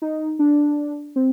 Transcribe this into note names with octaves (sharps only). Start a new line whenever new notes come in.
D#4
D4
C4